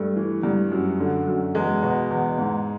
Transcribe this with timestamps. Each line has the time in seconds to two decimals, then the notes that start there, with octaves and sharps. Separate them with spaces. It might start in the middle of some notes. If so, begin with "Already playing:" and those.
Already playing: G2 A3
0.16 E3
0.43 G2
0.71 F#2
1.00 D3
1.27 F#2
1.55 E2 G#3
1.83 B2
2.10 E2
2.38 G#2